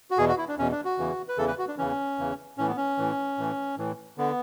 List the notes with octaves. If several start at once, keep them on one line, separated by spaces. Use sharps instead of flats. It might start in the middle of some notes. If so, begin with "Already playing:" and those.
F#4
E2 B2 G#4
F#4
E4
D4
E2 B2 C#4
D4
F#4
E2 C#3 E3
B4
E2 C#3 E3 A4
B4
F#4
D4
E2 C#3 E3 C#4
E2 C#3 E3
A2 E3 C#4
B3
C#4
A2 E3
A2 E3
A2 E3
D3 B3